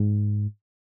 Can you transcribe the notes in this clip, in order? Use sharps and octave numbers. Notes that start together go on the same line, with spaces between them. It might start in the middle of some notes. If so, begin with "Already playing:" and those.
Already playing: G#2